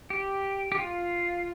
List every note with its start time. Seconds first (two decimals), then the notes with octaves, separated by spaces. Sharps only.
0.10 G4
0.72 G4
0.78 F4